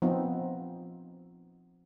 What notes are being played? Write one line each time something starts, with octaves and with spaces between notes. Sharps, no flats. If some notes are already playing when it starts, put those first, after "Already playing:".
F3 B3 C4 D#4